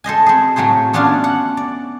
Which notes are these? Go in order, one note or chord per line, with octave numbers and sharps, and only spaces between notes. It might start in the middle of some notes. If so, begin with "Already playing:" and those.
A4 C5 D#5 G#5
C4 G#4
A2 F#3 A3 G#4 C5
A3 B3 C#4 D4 F4 D5
F#5
D5